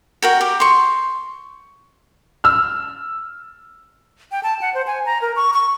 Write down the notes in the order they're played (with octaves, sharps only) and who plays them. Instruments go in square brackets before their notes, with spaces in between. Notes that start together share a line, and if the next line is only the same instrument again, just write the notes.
[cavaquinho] F#4 A#4 G5
G4
C6 C#6
[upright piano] E6 F6
[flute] G5
A5
F#5
C5
G#5
A#5
A#4
C#6
C#6